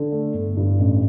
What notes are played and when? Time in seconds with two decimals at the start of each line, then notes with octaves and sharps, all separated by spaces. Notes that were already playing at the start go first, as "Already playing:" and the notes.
Already playing: D3
0.12 A3
0.34 G1
0.57 G2
0.79 A1